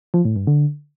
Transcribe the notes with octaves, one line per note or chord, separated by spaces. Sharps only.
F3
A2
G2
D3